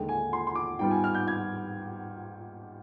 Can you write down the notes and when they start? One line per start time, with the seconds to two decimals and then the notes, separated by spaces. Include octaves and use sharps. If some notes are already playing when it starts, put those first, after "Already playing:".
Already playing: D#2 D3 G#3 G5
0.09 G#5
0.33 C6
0.47 C6
0.55 D6
0.79 G#2 G3 B3 F4 G5
0.91 G#5
1.04 F6
1.15 G6
1.28 G#6